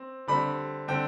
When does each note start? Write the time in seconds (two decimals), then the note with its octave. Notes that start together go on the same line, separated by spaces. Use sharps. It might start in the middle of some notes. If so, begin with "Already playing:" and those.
Already playing: C4
0.27 D3 G3 C4 B5
0.88 D3 G3 C4 G5